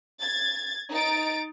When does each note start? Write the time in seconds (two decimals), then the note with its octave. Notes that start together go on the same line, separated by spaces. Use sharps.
0.22 G#6 A6
0.91 D#4 A6 D7